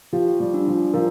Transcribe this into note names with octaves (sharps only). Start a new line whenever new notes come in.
F3 G4
G3
D4
F3
F3 A#4